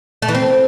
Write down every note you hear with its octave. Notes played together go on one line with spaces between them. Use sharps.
A3
E3
C4